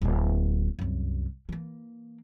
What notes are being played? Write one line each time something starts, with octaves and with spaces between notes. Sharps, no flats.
D1 A#3
C2 F#2
E3 A#3